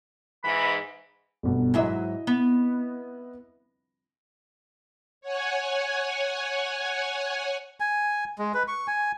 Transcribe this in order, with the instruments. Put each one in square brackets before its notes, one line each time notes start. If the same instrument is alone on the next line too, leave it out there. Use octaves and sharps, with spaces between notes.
[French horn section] G#2 E3 [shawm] B5
[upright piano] G1 B2
[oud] G#2 F#3 E5 [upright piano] E4 D#5
[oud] B3
[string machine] C#5 F#5 G#5
[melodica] G#5
G#3
B4
C#6
G#5